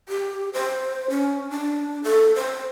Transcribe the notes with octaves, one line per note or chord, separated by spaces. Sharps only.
G4
C5
C#4
D4
A4
C5